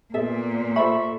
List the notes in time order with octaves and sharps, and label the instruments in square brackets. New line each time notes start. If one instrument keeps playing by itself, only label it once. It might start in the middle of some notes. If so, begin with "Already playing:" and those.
[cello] A#2 [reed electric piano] B3 [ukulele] G#4 A4 E5
[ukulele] F4 C5 B5 [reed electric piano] A4 C#6 [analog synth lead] E5